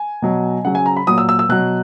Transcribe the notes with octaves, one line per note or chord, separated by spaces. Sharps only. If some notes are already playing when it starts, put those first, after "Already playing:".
Already playing: G#5
B2 F#3
C#3 F#3 F#5
G#5
A#5
B5
A#2 F#3 D#6
E6
E6
E6
B2 F#3 F#6